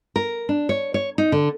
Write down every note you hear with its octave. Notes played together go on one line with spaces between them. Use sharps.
A#4
D4
C#5
C#5
D#4
D3